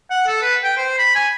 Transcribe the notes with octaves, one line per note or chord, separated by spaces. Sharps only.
F#5
A4
B4
G5
C5
B5
G#5